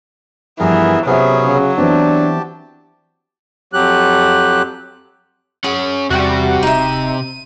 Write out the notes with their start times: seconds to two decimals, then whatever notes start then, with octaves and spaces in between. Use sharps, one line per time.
0.60 G2 E3 F3 B3 G#4 A#4
1.06 C3 F#3 B3 C#4 G#4 E5
1.45 C#3
1.78 E3 B3 C4 D4 G4 A5
3.73 F2 F#3 G4 F#6
5.64 C#4 G#4 F#5
6.10 E2 C3 G3 F#4
6.63 D1 D#4 E5 D#7